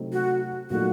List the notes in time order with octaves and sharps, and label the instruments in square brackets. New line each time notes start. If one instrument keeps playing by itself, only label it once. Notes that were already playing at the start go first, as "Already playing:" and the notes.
Already playing: [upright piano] C3 F#3 A3 C4 D#4
[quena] F#4
[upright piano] A#2 F#3 A3 D#4 [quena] F#4